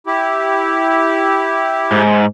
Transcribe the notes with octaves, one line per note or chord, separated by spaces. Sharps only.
E4 G4
G#2